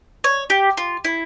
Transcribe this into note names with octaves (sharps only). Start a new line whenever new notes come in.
C#5
G4
F4
E4